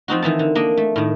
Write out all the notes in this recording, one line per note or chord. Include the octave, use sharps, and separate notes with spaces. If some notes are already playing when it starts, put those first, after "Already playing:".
F3 C4 D#4 F#4
D#3 E3 D#4 A5
D3
A#3 D4 D#5
A3
A2 D#3